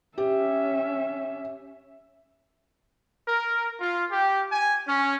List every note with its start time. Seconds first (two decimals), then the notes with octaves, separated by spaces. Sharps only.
0.18 C#4 G4 E5
3.28 A#4
3.81 F4
4.12 G4
4.52 G#5
4.87 C#4